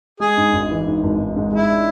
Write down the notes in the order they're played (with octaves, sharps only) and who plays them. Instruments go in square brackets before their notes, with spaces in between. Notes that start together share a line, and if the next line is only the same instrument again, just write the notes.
[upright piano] G#3 [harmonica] G#4
[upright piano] G#2
G#1
E3
G#2
G#1
G#2
G#2
[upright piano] G#3 [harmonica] E4
[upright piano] D4